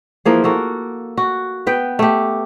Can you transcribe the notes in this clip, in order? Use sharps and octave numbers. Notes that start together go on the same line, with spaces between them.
E3 F3 A#3 G#4
A#3 F#4 A4
F#4
B3 B4 G5
A3 G4